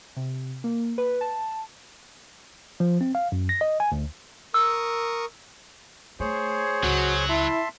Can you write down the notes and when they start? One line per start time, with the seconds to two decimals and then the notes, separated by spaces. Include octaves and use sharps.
0.16 C3
0.64 A#3
0.98 B4
1.21 A5
2.80 F3
3.01 C4
3.15 F5
3.32 F#2
3.49 A#6
3.61 D#5
3.80 G#5
3.92 D2
4.54 A#4 C#6 D#6 E6
6.20 A3 G#4 C5 C#5
6.83 C#2 F#3 F#4
7.29 E4 E5 A5 C6